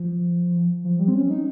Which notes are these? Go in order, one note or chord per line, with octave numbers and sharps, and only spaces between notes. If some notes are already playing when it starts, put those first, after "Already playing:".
Already playing: F3
F3
G3
C4
C#4
D#4